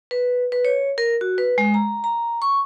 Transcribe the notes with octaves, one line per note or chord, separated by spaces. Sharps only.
B4
B4
C#5
A#4
F#4
B4
G#3
A#5
A#5
C#6